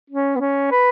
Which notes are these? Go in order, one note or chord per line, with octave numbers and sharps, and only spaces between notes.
C#4
B3
C#4
B4